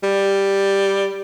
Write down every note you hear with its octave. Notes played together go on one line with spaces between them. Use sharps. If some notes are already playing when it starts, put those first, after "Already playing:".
G3